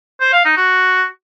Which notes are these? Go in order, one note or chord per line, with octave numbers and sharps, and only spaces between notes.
C5
F5
D#4
F#4